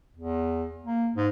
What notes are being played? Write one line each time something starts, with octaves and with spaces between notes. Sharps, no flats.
E2
A#3
G#2